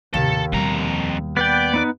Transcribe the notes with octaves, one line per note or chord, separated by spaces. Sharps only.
D#2 A2 C3 A4
F2 B2 G3 A#5
B3 B4 D5 G5
B3 D#4 B4